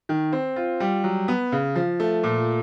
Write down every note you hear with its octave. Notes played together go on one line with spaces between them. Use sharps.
D#3
C4
F4
G3
F#3
B3
C#3
F3
A3
A#2